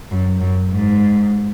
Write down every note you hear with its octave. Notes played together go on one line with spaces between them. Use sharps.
F#2
F#2
G#2